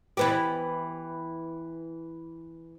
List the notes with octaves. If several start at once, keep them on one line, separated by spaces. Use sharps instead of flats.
E3 B3 G4